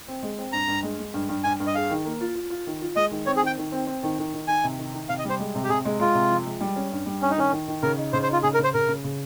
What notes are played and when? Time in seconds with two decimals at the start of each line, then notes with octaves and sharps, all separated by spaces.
0.08 C4
0.23 G#3
0.38 C4
0.53 G2 A#5
0.68 G2
0.83 G#3
0.98 G#3
1.14 G2
1.29 G2
1.44 G2 G#5
1.60 G2
1.67 D#5
1.75 G#4 F5
1.90 D#3
2.05 A#3
2.21 F4
2.35 F4
2.50 F4
2.66 D#3
2.82 F4
2.96 G#3 D#5
3.11 D#3
3.26 C4 C#5
3.36 G#4
3.41 D#3
3.47 G5
3.58 D#3
3.72 C4
3.87 C4
4.03 D#3
4.18 D#3
4.34 D#3
4.48 D#3 G#5
4.64 C3
4.78 D#3
4.93 D#3
5.09 C3 F5
5.19 D#5
5.25 G3 C5
5.40 G#3
5.55 C3
5.64 G4
5.69 C3 G#4
5.85 G#3
6.00 G#3 F4
6.15 C3
6.30 F3
6.45 G#3
6.61 G3
6.76 C#4
6.92 G2
7.06 G3
7.21 G2 C#4
7.31 D#4
7.37 D#3 C#4
7.52 D#3
7.68 D#3
7.83 C#3 A#4
7.97 D#4
8.13 C#3 C5
8.23 C5
8.28 D#4 F4
8.43 C#3 G#4
8.54 A#4
8.59 C#3
8.64 C5
8.74 C#3 A#4
8.88 C#3
9.04 C#3